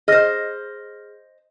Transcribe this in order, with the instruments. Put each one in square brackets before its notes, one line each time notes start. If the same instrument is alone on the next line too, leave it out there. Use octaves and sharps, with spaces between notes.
[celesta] G#4 F6 A#6 [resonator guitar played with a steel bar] C5 D#5